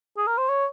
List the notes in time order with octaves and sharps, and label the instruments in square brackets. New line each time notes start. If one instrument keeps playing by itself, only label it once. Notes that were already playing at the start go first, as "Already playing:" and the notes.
[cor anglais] G#4
A#4
C5
C#5